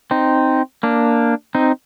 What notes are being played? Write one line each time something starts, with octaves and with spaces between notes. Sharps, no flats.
C4 D#4
A#3 D4
C4 D#4